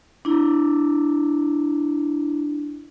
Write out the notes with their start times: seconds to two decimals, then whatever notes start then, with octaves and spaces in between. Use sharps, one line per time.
0.25 D4 E4